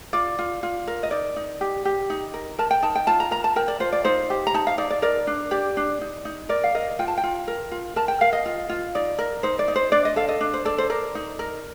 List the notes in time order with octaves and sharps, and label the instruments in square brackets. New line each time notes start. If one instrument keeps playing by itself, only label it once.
[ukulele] F4 D5
F4
F4
A#4
D#5
D#4 D5
D#4
G4
G4
D#4
A#4
A#4 A5
G5
D#4 A5
G5
F4 A5
A#5
A#4 A#5
A5
A#4 G5
D5
F4 C5
D5
D#4 C5
G4
A#5
D#4 A5
F5
D#4 D5
D5
A#4 D5
D4
G4 D5
D4
D#4
D#4
A#4 D5
F5
A#4 D#5
F4 G5
A5
G5
F4
A#4
F4
A#4 A5
G5
A#4 F5
D#5
F4
F4
D#4 D5
A#4
D#4 C5
D5
D#4
C5
D4 D5
D#5
A4 F5
D#5
D4
C5
A4 D5
C5
A#4 D5
D#4
A#4